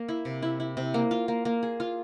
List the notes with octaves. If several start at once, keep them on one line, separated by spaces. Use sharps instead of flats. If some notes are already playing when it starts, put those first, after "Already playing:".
Already playing: A#3
E4
C3
E4
E4
C3
A#3
F4
A#3
A#3
G#4
F4